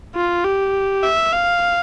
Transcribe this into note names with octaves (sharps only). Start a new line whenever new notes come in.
F4
G4
E5
F5